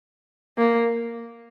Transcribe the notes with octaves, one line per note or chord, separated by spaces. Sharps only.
A#3